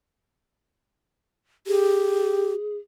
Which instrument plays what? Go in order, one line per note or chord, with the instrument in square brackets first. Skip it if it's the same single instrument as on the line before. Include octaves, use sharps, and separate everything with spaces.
[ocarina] G4 [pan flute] G#4